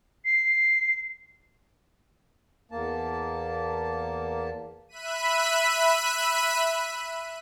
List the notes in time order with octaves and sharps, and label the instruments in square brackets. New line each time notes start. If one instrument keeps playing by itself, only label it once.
[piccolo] C7
[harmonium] E2 A#3 A5
[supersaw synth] E5 B5 F#6 B6 D#7